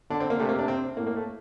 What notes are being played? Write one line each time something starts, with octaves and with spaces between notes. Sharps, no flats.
D3 D4
C4
A#3
C3 A3
A#3
D4
C4
A2 A#3
A#3
A3